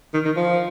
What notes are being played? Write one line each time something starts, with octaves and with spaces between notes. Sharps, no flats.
D#3
D#3
F3